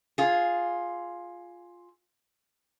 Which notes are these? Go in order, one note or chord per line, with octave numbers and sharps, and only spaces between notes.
F4 G#4